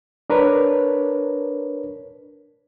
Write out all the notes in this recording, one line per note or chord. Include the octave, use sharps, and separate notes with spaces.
D4 A#4 B4 C#5